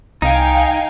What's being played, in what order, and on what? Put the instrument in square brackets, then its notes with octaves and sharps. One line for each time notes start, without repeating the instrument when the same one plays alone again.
[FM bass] C2 [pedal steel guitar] D#4 [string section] F5 G5 G#5